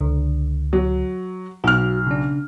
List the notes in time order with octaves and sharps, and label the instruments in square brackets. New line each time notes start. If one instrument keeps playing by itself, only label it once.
[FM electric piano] C#2 D3
[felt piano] F#3
[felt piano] B1 F6 [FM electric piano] F#4
[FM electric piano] C#3 D4